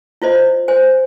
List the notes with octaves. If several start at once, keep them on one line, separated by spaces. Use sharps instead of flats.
E4 F4 C5 D#5
C5 G#5